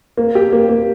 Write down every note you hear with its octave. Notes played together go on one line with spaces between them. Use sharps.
A#3
G4
A#3
A#3